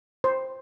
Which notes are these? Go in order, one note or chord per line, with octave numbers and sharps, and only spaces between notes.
C5